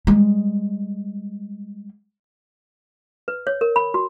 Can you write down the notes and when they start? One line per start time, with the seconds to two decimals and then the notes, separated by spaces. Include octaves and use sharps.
0.07 G3 G#3
3.28 B4
3.47 C#5
3.61 A#4
3.76 B5
3.94 F#4